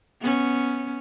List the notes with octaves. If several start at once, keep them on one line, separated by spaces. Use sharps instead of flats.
B3 C#4